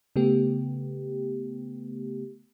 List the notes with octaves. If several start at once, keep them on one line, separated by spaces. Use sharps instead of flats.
C#3 A3 B3 G4